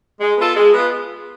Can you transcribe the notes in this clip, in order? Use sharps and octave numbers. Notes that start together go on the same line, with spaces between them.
G#3
B3 F4 A4
G#3
B3 F4